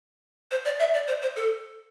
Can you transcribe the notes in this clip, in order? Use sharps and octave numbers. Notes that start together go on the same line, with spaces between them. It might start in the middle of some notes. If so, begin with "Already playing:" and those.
C5
D5
E5
D5
C5
C5
A4